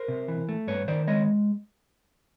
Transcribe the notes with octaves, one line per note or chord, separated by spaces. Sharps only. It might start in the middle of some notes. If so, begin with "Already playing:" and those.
Already playing: A#4 C5
C3
E3
A3
G2 B4 C#5
D#3 C5 D5
G#3 C#5 D#5